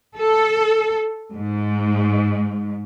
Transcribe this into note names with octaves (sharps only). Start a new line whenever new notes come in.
A4
G#2